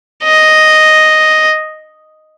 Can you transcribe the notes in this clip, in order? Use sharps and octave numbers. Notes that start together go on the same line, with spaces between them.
D#5